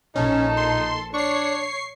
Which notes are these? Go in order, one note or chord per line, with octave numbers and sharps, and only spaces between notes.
A#1 C#4 D#4 A4
C6
D4 C#5 C#6 C7